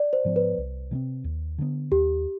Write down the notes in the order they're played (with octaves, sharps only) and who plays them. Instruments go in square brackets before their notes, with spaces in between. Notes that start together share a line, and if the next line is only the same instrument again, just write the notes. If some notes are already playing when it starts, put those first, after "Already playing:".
Already playing: [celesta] D5
C5
[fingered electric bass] G#2 F3 B3
[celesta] B4
[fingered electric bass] C2
C3 G3
C4
D#2
D3 G3 B3
[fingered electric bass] D#2 [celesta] G4